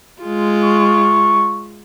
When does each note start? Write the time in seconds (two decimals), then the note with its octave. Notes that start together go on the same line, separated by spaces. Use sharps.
0.22 G#3 F4
0.63 C#6